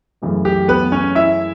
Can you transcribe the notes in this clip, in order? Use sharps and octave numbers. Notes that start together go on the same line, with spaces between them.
F#2 C#3 E3 A3
G4
B3 B4
C#4 C#5
E4 E5